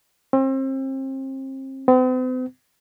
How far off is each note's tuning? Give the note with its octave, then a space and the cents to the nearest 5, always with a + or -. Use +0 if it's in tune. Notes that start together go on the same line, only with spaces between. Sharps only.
C4 +35
C4 -45